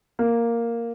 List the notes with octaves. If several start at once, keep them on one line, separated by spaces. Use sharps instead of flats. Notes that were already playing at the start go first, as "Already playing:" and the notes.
A#3